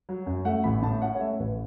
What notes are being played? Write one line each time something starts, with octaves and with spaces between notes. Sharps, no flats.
F#3
F#2
A3 F#5
A1 B5
A2 A5
C#4 F#5
C#5
A3 E5
A1 B4